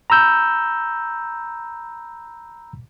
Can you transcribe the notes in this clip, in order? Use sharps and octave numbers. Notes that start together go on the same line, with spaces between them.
A#5 B5 E6 G6